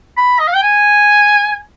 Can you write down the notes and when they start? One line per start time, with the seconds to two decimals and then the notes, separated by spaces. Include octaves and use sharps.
0.17 B5
0.39 D#5
0.47 F5
0.55 G5
0.63 G#5